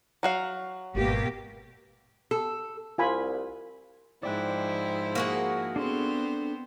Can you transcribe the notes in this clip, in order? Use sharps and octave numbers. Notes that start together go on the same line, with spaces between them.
F#3 F#4 F5
G#1 E2 B2 A#3 G4
A4
C2 F4 G#5 B5
G#2 F3 E4 C5 D5 G5 F#6
A#3 F#4 G#4
B3 C4 D4 A4 C5 C6